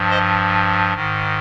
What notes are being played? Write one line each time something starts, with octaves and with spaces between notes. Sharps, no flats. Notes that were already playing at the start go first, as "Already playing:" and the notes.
Already playing: G2 F3
C5 D#5
G#2 D#3